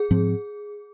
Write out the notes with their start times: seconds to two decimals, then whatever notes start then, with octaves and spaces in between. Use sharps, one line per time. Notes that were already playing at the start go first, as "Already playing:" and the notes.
Already playing: G#4
0.11 G#2 F3 C4